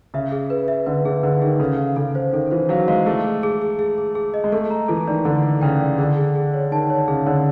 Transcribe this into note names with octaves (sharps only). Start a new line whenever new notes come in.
C#3 E5
G#4
B4
E5
D3 B4
D3 G#4
D3 B4
D#3 G#4
C#3 A4
F5
C#3 A4
C5
D#3 A4
E3 C5
F#3 F5
G#3 F5
A3 G#4
G#4
G#4
G#4
G#4
G#4
G#4
D#5
G#3
A3 A4
A#5
E3 A4
D#3 D5
D3 A4
A4
C#3 G5
D5
D3 G#4
G#4
G#4
C#5
D#3 A5
C#5
C#3 G#4
D3 C#5